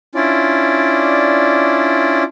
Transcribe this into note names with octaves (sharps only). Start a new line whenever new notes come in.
C#4 D4 E4 F4 D5